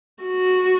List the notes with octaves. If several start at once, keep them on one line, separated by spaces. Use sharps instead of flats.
F#4